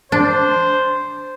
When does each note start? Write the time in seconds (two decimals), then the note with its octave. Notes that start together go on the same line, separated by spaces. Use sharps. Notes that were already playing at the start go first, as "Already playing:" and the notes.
0.12 D4 C5